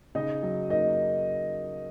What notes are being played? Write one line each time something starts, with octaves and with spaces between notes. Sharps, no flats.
C#3 D#4 D#5
F#3
A#3 D#4 D#5